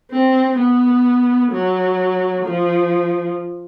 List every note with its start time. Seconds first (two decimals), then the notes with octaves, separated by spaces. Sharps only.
0.11 C4
0.59 B3
1.52 F#3
2.45 F3